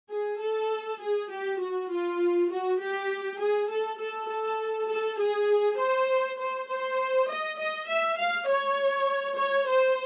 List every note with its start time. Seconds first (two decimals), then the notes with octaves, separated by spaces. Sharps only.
0.10 G#4
0.40 A4
1.01 G#4
1.29 G4
1.59 F#4
1.90 F4
2.50 F#4
2.79 G4
3.39 G#4
3.69 A4
3.98 A4
4.28 A4
4.89 A4
5.19 G#4
5.78 C5
6.38 C5
6.68 C5
7.28 D#5
7.57 D#5
7.88 E5
8.17 F5
8.47 C#5
9.37 C#5
9.67 C5